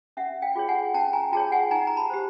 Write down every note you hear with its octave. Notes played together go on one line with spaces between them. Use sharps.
C#4 E5 F#5
F5 G5
F4 G#4 C#5
F#5 G#5
C#4 G5 A5
G#5 A#5
F4 G#4 C#5 G5 A5
F#5 G#5
D#4 G#5 A#5
A#5
A5 B5
G4 C5